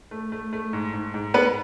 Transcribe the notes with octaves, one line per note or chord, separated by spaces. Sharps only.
A3
A3
A3
G#2
G#2
G#2
G#2 B3 B4